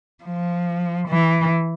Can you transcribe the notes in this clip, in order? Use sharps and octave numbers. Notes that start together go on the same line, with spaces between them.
F3
E3